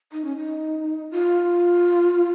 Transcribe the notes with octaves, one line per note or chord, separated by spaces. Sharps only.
D#4
C#4
D#4
F4